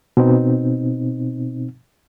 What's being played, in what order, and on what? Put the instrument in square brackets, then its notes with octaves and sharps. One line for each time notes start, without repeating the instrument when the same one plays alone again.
[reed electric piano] B2 C4 D#4